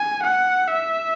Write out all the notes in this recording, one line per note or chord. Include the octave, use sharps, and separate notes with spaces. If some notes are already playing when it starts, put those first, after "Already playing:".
Already playing: G#5
F#5
E5